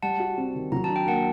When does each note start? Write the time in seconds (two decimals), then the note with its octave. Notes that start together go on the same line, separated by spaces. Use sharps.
0.02 G3 F#5 A5
0.20 F#4
0.38 C4
0.55 D#3
0.72 F#3 A#5
0.84 A5
0.90 D4
0.96 G5
1.07 A#3 F#5 A5